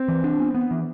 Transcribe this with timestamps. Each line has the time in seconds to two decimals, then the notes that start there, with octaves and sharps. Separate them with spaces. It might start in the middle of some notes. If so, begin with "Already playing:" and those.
Already playing: C4
0.08 E3
0.24 D4
0.39 B3
0.55 B3
0.71 E3